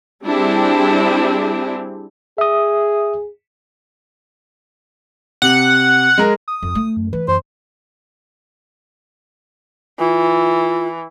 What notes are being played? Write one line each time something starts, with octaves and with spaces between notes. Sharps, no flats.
G3 C4 D4 E4 G4 G#4
G#4 E5 D#6
C3 F#5
G#3 A#4
D#6
F2
A3
F#2
E3 B4
F#2 C5
E3 F4